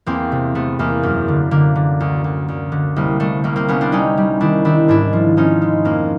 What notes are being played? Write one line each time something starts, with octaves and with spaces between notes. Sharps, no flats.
E2 A#3 C4
C3
C3 A3 B3
E2 A#3
F#2 A#3
D3
D3 A#3
D3
D2
D2
D2
D3
C2 A#3
C2 A3
C2 A#3
A#3 C4
C2 B3 C#4
C4 D4
G3 C#4 D#4
G3
D#3 D4 E4
D#3 D4 E4
G#2 D4 E4
F3
F3 C#4 D#4
G#3
F2 A#3